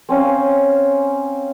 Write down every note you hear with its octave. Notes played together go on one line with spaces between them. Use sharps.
C4 C#4 F5